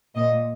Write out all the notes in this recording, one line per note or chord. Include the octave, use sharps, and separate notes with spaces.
A#2 D#5